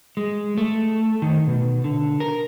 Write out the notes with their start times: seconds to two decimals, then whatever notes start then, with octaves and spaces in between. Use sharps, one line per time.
0.17 G#3
0.58 A3
1.22 D#3
1.47 B2
1.84 D3
2.20 A#4